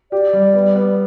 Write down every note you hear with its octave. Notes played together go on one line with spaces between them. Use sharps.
G4 D5
G3
B3
B3